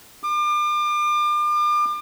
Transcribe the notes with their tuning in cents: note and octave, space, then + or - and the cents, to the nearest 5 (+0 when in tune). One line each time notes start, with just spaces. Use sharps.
D6 +35